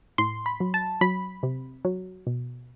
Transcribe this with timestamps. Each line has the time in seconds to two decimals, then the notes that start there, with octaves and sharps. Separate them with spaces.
0.18 A2 C6
0.46 B5
0.60 F#3
0.74 A5
1.01 F#3 B5
1.43 C3
1.85 F#3
2.27 B2